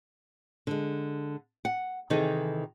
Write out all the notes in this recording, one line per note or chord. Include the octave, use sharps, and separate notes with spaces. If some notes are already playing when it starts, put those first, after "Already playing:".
D3 G#3
F#5
C3 D#3 E3 D#4 G#4 A4